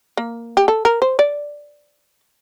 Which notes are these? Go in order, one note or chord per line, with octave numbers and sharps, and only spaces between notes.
A#3
G4
A4
A#4
C5
D5